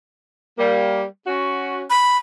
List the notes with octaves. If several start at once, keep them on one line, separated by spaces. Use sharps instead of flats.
G3 A#3
C#4 F#4
B5